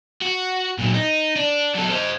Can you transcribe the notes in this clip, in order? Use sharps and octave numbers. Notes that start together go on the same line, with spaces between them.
F#4
A#2 F#3
D#4
D4
F#3 A4
C5 D#5